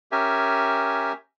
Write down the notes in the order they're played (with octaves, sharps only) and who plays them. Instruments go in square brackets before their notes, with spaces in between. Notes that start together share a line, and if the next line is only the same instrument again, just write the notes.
[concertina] C#4 G4 A#4 E5 G#5